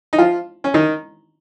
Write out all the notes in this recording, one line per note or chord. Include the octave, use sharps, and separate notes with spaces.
D#4
F3 F4
C#4
D#3 D#4